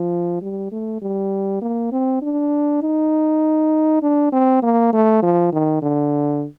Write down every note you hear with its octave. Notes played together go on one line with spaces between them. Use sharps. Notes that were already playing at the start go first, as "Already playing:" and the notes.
Already playing: F3
G3
A3
G3
A#3
C4
D4
D#4
D4
C4
A#3
A3
F3
D#3
D3